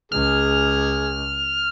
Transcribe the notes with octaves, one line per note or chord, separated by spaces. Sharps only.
C#2 G#4 F6